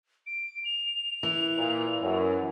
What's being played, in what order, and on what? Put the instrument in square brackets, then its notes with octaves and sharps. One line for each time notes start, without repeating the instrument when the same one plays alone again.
[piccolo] D7
F7
[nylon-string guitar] E3
[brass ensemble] A#2
F#2